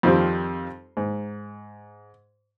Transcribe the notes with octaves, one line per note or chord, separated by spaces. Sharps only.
F2 D#3 F3 G3 C4
G#2